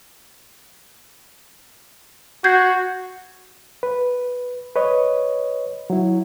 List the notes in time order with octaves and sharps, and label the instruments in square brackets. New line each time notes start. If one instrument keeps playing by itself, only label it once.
[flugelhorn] F#4 [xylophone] G6 G#6 C7
[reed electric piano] B4
B4 C#5 D#5
F#3 E4